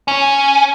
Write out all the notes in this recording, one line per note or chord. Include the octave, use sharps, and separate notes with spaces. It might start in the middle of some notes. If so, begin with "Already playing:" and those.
C#4